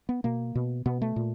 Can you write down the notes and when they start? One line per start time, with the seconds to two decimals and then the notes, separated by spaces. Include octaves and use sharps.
0.09 B3
0.24 B2 A#3
0.55 B2
0.86 B2 B3
1.02 A3
1.16 A#2